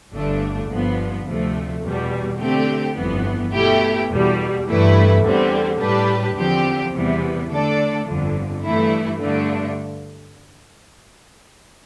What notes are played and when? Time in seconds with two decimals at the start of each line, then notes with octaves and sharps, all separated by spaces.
0.12 G1 G2 D3 A3 D4
0.68 G1 G2 F3 B3
1.25 D2 C3 F3 A3
1.82 E2 B2 G3
2.39 D3 A3 C4 G4
2.95 G1 F2 E3 B3
3.53 B2 A3 E4 G4
4.09 E2 B2 G3
4.66 G2 E3 A3 E4 B4
5.22 E2 D3 G3 C4
5.79 A2 G3 D4 G4 B4
6.37 E2 D3 F3 C4 G4
6.94 E2 C3 E3 G3 B3
7.49 D3 A3 D4 A4 D5
8.06 G1 F2 D3
8.63 G2 E3 A3 E4
9.20 G2 D3 A3 D4